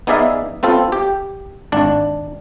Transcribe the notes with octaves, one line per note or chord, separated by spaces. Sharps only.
B3 D#4 G#4 D5 E5 F5
B3 C4 F4 A4
G4
G#1 D4 D5